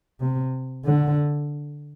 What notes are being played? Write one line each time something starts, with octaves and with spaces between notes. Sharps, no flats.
C3
D3